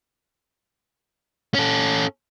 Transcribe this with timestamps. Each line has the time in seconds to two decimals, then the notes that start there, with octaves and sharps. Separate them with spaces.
1.54 C#4 A4